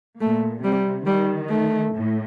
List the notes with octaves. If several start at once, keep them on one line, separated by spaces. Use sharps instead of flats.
A#2 A3
C3 G3
D#3 G3
A3
A2